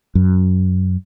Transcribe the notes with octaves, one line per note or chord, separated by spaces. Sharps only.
F#2